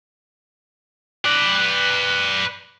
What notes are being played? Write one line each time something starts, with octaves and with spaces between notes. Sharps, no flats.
B4 D5